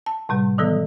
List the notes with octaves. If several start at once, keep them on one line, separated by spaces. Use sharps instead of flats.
A5
A2 C3 G3
D#3 E3 F#3 B3 A4